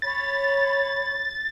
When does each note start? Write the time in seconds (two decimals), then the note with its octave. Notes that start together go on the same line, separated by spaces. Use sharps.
0.02 C#5 B5 A6